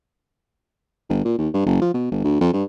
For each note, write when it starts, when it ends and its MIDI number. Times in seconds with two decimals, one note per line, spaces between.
1.10 1.22 31
1.25 1.37 46
1.39 1.48 39
1.54 1.61 43
1.66 1.81 30
1.82 1.90 53
1.94 2.07 47
2.11 2.20 31
2.24 2.39 38
2.41 2.50 41
2.54 2.63 43